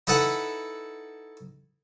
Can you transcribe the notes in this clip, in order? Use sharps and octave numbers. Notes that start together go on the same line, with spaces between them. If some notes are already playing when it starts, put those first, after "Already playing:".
D#4 E4 A4 B4 F#5